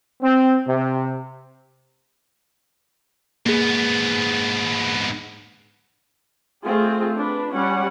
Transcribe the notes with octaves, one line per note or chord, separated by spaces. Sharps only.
C4
C3
G#2 A#3 B3 G#4
A3 C4 F4 G#4
D4 B4
G3 C#4 F#5